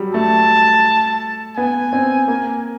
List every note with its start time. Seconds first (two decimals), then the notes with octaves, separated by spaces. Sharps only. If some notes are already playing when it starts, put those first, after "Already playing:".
Already playing: F#3 G3
0.14 A3 A5
1.57 B3 G#5
1.93 C4
2.28 A#3